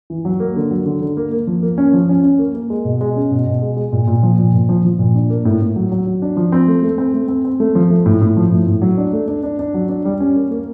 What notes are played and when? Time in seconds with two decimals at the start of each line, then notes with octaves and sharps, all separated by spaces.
0.10 E3
0.25 F#3
0.40 A#3
0.56 D3
0.71 F#3
0.86 D3
1.01 D3
1.17 A#3
1.32 A#3
1.47 F3
1.63 A#3
1.78 C#4
1.93 F3
2.09 C#4
2.24 C#4
2.39 A#3
2.54 A#3
2.70 G#3
2.85 B2
3.01 G#3
3.16 C#4
3.31 B2
3.46 B2
3.62 G#3
3.77 G#3
3.92 A#2
4.07 A#2
4.23 F3
4.38 A#2
4.53 A#2
4.69 F3
4.85 F3
4.99 A#2
5.15 D4
5.30 A#3
5.45 A2
5.61 A2
5.76 F#3
5.92 F#3
6.06 F#3
6.22 D4
6.37 F3
6.52 C4
6.68 A3
6.83 A3
6.98 C4
7.14 A3
7.29 C4
7.45 C4
7.60 A3
7.75 F3
7.90 A3
8.06 A2
8.21 A2
8.37 F3
8.52 A2
8.67 A2
8.82 F#3
8.98 D4
9.13 A3
9.28 D4
9.43 D4
9.59 D4
9.74 F#3
9.89 D4
10.05 G3
10.20 C#4
10.36 A#3
10.51 A#3